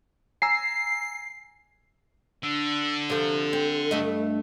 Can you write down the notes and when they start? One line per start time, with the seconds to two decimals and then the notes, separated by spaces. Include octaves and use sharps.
0.42 G#5 A#5 E6 C7
2.43 D3 E6
3.10 C3 F3 A4
3.53 C4
3.91 G2 A3 D#5